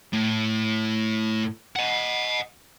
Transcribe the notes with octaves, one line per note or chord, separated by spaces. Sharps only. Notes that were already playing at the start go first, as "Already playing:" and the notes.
A2
D#5 F#5